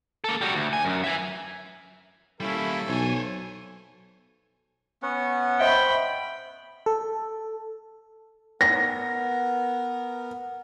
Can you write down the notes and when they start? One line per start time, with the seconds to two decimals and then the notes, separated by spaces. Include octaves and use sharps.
0.24 A#3 A4
0.41 G3 F#4
0.55 D2
0.73 G#5
0.85 F#2
1.04 E5 G#5
2.40 G3 A#3 C#4 E4 A4
2.88 B1 C5 C#5 G#5
5.02 B3 C#4 F#5
5.60 C5 D#5 E5 G5 B5
6.86 A4
8.61 B3 A#4 A#6